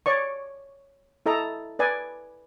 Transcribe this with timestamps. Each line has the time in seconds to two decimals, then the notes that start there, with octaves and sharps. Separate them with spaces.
0.06 C#5 D5 C#6
1.26 E4 A4 D#5 A#5
1.79 B4 D5 G#5